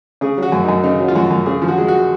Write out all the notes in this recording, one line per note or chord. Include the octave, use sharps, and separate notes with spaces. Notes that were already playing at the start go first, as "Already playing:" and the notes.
C#3 G#4
F#3 F#4
F#2
F#2 D#4
C#3 D#4
F#3
F4
F#2 F#4
F#2
C#3 G#4
F3
F#4
G#3
F#4